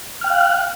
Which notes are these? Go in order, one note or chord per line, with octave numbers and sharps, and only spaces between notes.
F5 G5 F6 F#6